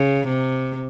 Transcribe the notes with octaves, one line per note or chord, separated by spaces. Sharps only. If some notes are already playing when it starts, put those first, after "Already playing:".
Already playing: C#3
C3